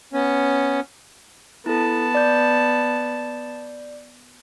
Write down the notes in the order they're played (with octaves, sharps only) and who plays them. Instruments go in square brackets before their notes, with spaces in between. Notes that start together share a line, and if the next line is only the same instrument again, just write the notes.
[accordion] B3 C#4
[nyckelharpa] B3 A5 [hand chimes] E4 A4
[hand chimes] D5 G6